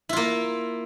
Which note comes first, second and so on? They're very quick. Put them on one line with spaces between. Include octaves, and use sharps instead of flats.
E4 F4 A#3